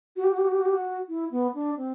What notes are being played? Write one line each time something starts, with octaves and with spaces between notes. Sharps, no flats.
F#4
G4
F#4
G4
F#4
G4
F#4
G4
F#4
E4
B3
D4
C4